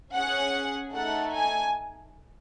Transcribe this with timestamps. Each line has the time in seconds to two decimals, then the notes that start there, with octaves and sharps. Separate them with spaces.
0.13 C#4 G#4 F#5
0.93 A3 D#4 A4 F#5
1.34 G#5